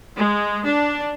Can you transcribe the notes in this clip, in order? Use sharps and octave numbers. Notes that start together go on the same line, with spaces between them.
G#3
D4